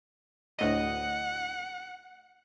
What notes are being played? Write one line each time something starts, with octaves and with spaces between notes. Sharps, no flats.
D2 A2 D#5 F#5